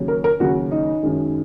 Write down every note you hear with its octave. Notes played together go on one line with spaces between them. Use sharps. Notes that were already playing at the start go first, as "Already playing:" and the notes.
Already playing: D#2 C#3 F#3
A#4
A#4
D#2 C#3 F#3 F#4
D#4
F#2 D#3 G#3